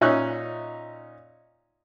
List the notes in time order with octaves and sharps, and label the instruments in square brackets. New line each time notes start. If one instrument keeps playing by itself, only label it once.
[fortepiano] A#2 C#4 D#4 E5 C#6 F#6